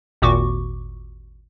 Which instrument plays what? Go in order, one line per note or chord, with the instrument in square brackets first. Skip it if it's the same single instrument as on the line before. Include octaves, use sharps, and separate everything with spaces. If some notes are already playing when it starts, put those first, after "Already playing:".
[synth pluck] G#1 D#2 A#2 F#4 C#6 D6